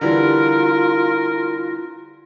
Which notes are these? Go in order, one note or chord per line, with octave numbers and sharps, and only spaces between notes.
D3 E3 G3 F4 A#4